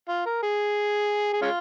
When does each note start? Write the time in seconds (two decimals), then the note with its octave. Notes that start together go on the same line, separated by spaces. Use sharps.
0.09 F4
0.26 A#4
0.43 G#4
1.33 G#4
1.42 G#3 C#4 F4